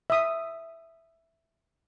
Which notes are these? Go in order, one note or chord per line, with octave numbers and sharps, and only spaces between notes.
E5 D#6